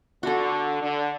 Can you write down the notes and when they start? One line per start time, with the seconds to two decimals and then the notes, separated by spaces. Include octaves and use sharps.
0.23 D3 F#4 A4
0.82 D3